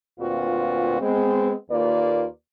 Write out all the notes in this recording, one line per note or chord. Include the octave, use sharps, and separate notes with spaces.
D2 A#2 C4 F4 F#4 B4
G#3 B3 C4
D#2 A#3 F4 B4 D5